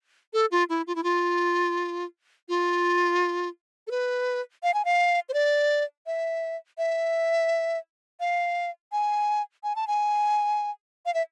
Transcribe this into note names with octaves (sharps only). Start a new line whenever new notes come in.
A4
F4
E4
F4
E4
F4
F4
A4
B4
F5
G#5
F5
C5
D5
E5
E5
F5
G#5
G#5
A5
G#5
F5
E5